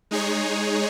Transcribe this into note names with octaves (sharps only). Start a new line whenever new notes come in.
G#3 D#4 G#4 C#5